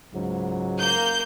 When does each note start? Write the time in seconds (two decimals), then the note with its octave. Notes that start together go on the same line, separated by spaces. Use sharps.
0.14 C#2 G#2 F#3
0.81 A#3 G6